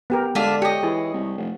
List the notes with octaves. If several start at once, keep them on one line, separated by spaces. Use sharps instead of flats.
B3 G4 A#4
D3 G#3 D4 F4 E5
G4 C#5 D#5
E3 G#4
C2
F1